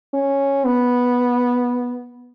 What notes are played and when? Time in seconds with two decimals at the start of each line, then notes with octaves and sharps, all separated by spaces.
0.14 C#4
0.64 B3